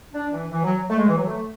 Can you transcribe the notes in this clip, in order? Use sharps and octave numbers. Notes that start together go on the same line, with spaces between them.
D4
E3
E3
F#3
A3
G#3
E3
F#3
A3